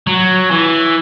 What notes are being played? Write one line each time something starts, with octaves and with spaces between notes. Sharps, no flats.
F#3
E3